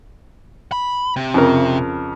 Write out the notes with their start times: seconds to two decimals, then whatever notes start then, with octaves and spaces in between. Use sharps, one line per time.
0.72 B5
1.16 C3
1.34 F2 C#3 A#4